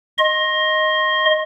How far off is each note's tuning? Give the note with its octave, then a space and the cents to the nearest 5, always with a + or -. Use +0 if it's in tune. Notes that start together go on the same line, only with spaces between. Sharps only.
D#5 +0 C6 +35